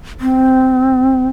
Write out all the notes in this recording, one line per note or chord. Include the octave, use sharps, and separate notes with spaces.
C4